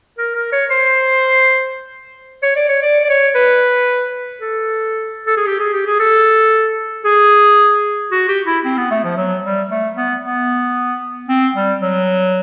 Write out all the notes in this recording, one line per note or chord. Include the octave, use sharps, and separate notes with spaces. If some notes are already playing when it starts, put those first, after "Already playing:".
A#4
A#4
C#5
C5
C#5
D5
C#5
D5
D5
C#5
B4
A4
A4
G#4
G4
G#4
G4
G#4
A4
G#4
F#4
G4
E4
C4
B3
A3
F3
F#3
G3
A3
B3
B3
C4
G3
F#3